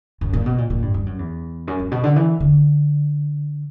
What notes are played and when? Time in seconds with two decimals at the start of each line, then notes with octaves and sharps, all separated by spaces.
0.21 F#2
0.33 A#2
0.46 B2
0.58 A#2
0.70 A#2
0.82 G2
0.94 G2
1.06 F#2
1.19 E2
1.67 F#2
1.79 G2
1.91 B2
2.04 D3
2.16 E3
2.40 D3